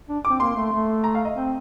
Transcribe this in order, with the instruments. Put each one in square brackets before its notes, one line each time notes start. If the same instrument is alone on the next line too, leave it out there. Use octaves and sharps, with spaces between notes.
[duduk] D4
[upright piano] D6
[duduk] C4
[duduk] A#3 [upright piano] C6
[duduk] A3
A3
[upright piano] A#5
F5
D#5
[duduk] C4